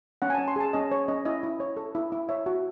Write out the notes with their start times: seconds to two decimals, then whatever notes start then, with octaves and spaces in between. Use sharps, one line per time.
0.22 C#4 F#5
0.30 G#5
0.35 C#4 A5
0.48 C6
0.56 G#4 A5
0.73 C#4 D#5
0.91 C#5
1.08 C#4 D#5
1.25 E4 D#5
1.43 E4
1.60 C#5
1.77 A4
1.95 E4
2.12 E4
2.29 C#5 E5
2.46 F#4